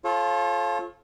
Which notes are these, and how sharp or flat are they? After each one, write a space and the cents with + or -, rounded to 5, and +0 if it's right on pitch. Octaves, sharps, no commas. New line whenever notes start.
F4 +0 A4 -30 C#5 -40